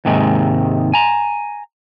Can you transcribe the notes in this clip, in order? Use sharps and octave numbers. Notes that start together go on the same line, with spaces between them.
D#2 G#2 C3 D#3 G#3
G#5 A#5